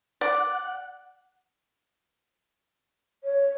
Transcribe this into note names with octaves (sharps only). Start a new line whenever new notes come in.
D5 F#5
C#5